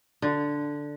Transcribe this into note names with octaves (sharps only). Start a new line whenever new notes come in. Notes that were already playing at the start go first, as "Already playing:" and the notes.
D3